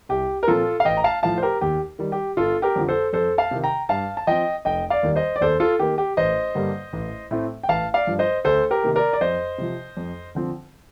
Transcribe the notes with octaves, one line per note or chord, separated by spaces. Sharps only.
C2 G4
A#4
A#2 F3 C4 F4 A4
F5
A1 D#5 G5
A#5
F5 A5
A2 F3 F5 A5
C5
G4 A#4
D#2 G4
D#3 G3
G4
G1 F4 A4
G4 A#4
F2 D3 F3
A4 C5
F2 A4 C5
F5 A5
C3 D#3
G5 A#5
G2 F5 A5
A5
F3 C4 D#5 G5
F1 D#5 G5
D5 F5
D#2 D#3 G3
C5 D#5
D5
D#2 A4 C5
F4 A4
D#3 A#3 G4
G4
A1 C5 D#5
G2 D3 G3 A#3
A1
A2 A3 C4
G5
A1 F5 A5
D5 F5
G2 F3
C5 D#5
D2 A4 C5
G4 A#4
C3 D#3 A#3
A#4 D5
D5
F2 C5 D#5
C3 F3
F2
D3 F3 C4